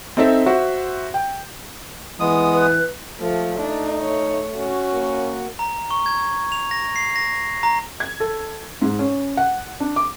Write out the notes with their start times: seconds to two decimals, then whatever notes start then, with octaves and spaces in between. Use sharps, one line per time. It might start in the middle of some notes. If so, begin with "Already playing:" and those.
0.17 C4 D#4 A4 C5 E5
0.46 F#4 C5 E5 F#5
1.14 G5
2.20 E3 G#3 B3 D#6
2.53 B4
3.21 F3 A3
3.59 D4 D#4
4.01 C#5
4.57 C#4 F#4
4.93 A#3
5.59 A#5
5.91 C#6
6.06 G#6
6.52 F7
6.71 A#6
6.96 C7
7.16 A#6
7.63 A#5
8.00 G#6
8.20 A4
8.82 G#2
8.99 C#4
9.37 F#5
9.80 D4
9.96 D6